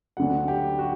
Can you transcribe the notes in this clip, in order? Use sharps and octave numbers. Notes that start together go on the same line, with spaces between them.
D2 D3 F#3 F#5
G4
F#4